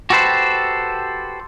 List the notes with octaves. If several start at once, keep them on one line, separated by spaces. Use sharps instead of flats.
F#4 G4 A4 B4 C5